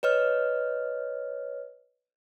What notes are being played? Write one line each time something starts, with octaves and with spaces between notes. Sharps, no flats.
B4 C#5 D#5 F6